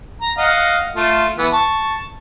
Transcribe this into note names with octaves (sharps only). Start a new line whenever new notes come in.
A#5
D#5 F5 F#5
A3 F4
E3 B3
A5 C#6